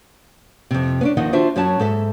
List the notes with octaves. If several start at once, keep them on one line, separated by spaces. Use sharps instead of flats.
F2 C3
B3 C#4 D4
D#2 D#3 F3 D#4 D#5 F#5
D4 F4 F#4 C5 E5
F#2 F#3 C#4 F#4 A5
G#2 A4 E5